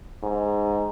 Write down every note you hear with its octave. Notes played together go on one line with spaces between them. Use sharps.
G#2